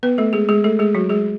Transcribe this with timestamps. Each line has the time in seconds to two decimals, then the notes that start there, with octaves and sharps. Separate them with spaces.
0.03 B3 B4
0.18 A3 A4
0.33 G#3 G#4
0.49 G#3 G#4
0.64 A3 A4
0.79 G#3 G#4
0.95 F#3 F#4
1.09 G#3 G#4